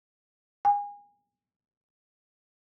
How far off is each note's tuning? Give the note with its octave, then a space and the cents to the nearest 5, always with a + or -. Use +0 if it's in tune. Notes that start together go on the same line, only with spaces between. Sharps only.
G#5 -30